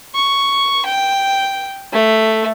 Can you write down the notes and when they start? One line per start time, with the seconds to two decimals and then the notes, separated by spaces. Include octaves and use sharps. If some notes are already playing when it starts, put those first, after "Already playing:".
0.15 C#6
0.85 G5
1.93 A3